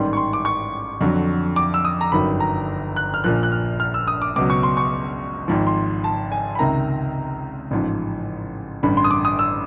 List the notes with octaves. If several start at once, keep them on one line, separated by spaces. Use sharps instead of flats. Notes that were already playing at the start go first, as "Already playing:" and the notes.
Already playing: A1 G#2 D#3 G3 C6
C#6
C6
D6
C#6
F2 D3 F#3
D6
E6
D#6
A#5
G1 F#2 D#3 F#3 B5
A#5
F#6
F6
A#1 A#2 F3 F#6
F#6
F6
F6
E6
D#6
D6
C#2 B2 F#3 D6
C#6
C6
C#6
G#1 G#2 F3
C6
A5
G#5
B5
C#2 C3 D#3 A#5
A1 G#2 F3
A1 G2 D3 B5
C6
D#6
D6
D#6
E6